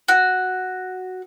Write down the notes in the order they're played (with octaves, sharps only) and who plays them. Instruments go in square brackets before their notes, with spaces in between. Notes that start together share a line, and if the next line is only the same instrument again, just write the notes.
[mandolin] F#4